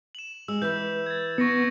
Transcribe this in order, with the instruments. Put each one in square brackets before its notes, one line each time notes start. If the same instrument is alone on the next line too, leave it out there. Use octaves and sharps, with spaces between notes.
[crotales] E7 F#7
[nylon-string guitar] G#3 [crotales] E6
[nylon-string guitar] E3 B4 [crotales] G6
[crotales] G#6 A6
[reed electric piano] B3 [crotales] C#6 A#6 C#7